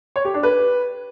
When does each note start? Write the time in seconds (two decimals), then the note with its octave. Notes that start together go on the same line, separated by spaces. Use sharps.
0.16 C#5
0.25 G4
0.34 D4
0.43 B4